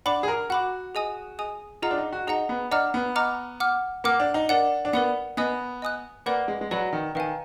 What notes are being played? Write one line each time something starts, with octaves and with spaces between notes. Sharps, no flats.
D4 F#5 B5 D6
G#4
A#4
F#4 F#5 B5 D6
G#4 D#5 G#5 D#6
G#4 D#5 G#5 D#6
F4 G#4 D#5 F#5 A#5
D4
D#4
F#4
D#4 G#4 D#5 F#5 A#5
B3
D4 D#5 F#5 A#5 D6 F6
B3
D#5 F#5 A#5 D6 F6
F#5 D6 F6
A#3 F#5 D6 F6
D4
D#4
D4 A#4 D5 F#5
D4
B3 A#4 D5 F#5
B3 D#5 G#5 D#6 F#6
D#5 G#5 D#6 F#6
A#3 B4 D5 F#5 B5
G#3
G#3
F#3 B4 D5 F#5 B5
D#3
D#3 B4 F5 G#5